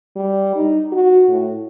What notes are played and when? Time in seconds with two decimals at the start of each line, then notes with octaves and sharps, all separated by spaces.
0.16 G3
0.56 D#4
0.92 F#4
1.29 A2